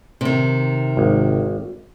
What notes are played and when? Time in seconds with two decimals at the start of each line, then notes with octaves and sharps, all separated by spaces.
0.21 C3 D#3
0.97 G#1